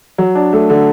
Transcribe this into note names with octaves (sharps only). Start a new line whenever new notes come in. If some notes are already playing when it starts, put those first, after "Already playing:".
F#3
D4
A3
D3